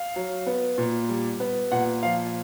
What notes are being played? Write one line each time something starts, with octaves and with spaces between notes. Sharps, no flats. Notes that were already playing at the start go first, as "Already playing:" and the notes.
Already playing: F5
F#3
B3
A#2
G3
B3
A#2 F#5
F3 F5